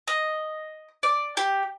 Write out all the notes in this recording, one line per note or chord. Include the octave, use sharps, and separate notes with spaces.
D#5
D5
G4